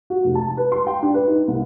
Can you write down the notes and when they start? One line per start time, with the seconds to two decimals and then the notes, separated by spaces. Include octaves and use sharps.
0.10 F#4
0.24 F1
0.35 A5
0.57 B4
0.72 C6
0.87 G5
1.02 D4
1.14 B4
1.28 D#4
1.48 C2